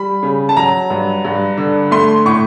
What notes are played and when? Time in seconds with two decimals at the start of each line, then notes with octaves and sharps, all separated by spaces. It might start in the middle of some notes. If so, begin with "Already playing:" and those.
Already playing: G3 B5
0.23 C#3
0.49 A5
0.57 F#3 A#5
0.90 G2
1.25 G2
1.57 D3
1.91 A3 C6
2.26 A2 C#6